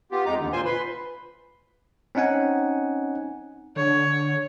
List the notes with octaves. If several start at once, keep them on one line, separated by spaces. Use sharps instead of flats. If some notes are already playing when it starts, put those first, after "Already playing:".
B3 F4 G4
F2 G#3 D#4 A#5 D6
D#2 D3
A#2 F4 C5 G#5 C6
B4 B5 C6
C4 C#4 D#4 F#5 G#5
D3 C#5